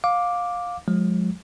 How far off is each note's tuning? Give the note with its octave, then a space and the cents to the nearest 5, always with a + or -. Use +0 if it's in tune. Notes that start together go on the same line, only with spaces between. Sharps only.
F5 +20 D6 +0
F3 +45 G#3 +0